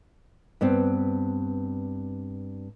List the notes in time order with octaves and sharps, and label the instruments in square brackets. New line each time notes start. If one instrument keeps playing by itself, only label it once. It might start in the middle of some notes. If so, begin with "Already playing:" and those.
[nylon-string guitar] G2 B3 C4